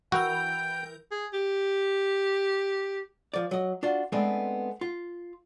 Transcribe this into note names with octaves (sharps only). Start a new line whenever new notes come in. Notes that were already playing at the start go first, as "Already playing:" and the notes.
E3 F#4 A#4 G5 G6
G#4
G4
F3 D5
F#3 D#5
D4 F4 F#4
G#3 A3 B3 C4 D4
F4